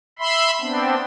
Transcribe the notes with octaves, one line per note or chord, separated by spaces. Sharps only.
E5 B5 C6
B3 C4 D4